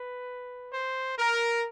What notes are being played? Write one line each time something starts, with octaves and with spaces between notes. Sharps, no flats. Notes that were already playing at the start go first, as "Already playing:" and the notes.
Already playing: B4
C5
A#4